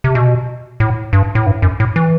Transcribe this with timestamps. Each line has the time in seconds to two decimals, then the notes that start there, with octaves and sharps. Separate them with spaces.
0.04 C3
0.15 B2
0.80 A2
1.13 G2
1.35 A2
1.46 G2
1.62 F#2
1.80 A2
1.96 E3